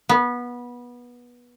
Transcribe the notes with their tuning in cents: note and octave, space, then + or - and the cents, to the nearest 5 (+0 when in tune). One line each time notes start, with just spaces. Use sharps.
B3 -20